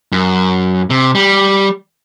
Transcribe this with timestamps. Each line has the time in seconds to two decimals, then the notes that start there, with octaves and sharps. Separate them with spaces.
0.12 F#2
0.90 C3
1.15 G3